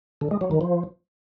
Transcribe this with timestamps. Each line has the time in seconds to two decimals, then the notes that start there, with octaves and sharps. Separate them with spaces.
0.21 D3
0.31 G#3
0.41 F#3
0.51 D#3
0.61 F3